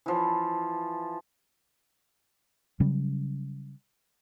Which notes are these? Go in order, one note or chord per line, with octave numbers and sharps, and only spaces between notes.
E3 F3
C#3 F#3 G3 C#4